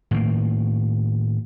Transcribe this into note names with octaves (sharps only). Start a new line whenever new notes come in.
A2 D#3 A#3